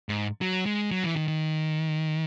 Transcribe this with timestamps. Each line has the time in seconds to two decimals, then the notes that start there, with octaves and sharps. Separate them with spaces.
0.09 G#2
0.41 F#3
0.66 G#3
0.91 F#3
1.04 E3
1.16 D#3
1.28 D#3